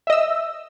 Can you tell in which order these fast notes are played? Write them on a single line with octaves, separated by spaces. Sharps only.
E5 D#5 E6